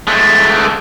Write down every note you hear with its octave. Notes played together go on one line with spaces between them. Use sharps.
G#3 A3